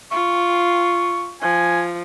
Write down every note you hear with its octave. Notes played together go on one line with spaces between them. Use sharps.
F4 C#6
F3 G#5